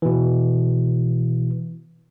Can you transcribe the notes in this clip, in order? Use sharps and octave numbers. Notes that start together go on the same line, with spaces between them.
B2 E3